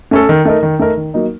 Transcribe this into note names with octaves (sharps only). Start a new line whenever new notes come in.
A3 C#4 A4
D#3
A3 D#4 A#4
D#3
A3 D#4 A#4
D#3
F#3 A#3 D#4